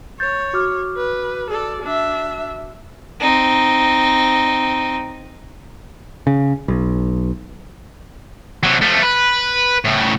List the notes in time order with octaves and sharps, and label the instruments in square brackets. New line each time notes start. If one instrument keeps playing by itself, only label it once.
[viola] C#5 [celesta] G6 A6
[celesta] F#4 D6 F6
[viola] B4
A4 D5
D4 E5
[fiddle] C4 D#4
[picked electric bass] C#3
B1
[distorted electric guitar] C3 F#3
F3 A3
B4
A2 C#3